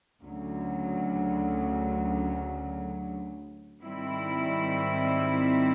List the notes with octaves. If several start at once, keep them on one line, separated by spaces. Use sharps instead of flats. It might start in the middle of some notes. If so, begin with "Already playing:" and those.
D2 C#3 F#3
G#2 D#3 G3 C4 E4